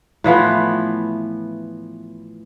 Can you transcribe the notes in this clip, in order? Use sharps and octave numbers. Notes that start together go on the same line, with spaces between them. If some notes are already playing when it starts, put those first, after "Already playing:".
A2 E3 F3 B3